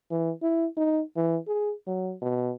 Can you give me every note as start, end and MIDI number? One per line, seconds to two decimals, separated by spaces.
0.11 0.31 52
0.42 0.67 64
0.77 1.02 63
1.16 1.38 52
1.48 1.74 68
1.87 2.14 54
2.22 2.54 47